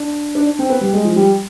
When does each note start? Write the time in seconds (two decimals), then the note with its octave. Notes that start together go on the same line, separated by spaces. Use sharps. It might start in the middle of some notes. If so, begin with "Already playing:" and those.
Already playing: D4
0.35 D4
0.47 D4
0.59 C4
0.70 B3
0.81 G3
0.93 G#3
1.05 F3
1.16 G3